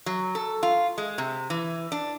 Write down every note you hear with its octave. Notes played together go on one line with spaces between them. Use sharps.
F#3
A4
F4
G#3
C3
E3
D4